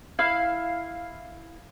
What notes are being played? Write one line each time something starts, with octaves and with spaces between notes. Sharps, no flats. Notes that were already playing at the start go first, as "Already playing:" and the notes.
E4 F5